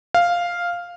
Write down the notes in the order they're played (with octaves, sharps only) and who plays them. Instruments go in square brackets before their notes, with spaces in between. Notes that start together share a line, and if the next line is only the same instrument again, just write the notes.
[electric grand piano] F5